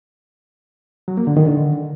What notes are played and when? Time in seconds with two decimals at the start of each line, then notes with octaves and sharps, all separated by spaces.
1.08 F#3
1.17 A#3
1.27 D3
1.37 D#3
1.46 D3